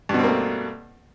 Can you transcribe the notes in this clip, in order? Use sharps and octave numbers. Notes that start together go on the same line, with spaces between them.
G2 B2 A3 A#3 C4